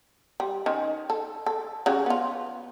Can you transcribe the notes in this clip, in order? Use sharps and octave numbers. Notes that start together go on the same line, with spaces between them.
G3
D#3 C#4
A4
A4
C#3 F#3 G4
B3 F4